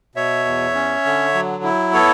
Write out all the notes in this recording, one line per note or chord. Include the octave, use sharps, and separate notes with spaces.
B2 C#5 E5
E2
C#4
D3
F#3
E4
B3 A4 C#5